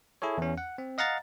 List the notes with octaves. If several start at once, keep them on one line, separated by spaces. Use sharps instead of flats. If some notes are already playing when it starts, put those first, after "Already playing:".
E4 G#4 A4 C#5
E2 C#4
F#5
C4
D#5 F5 F#5 A#5 A6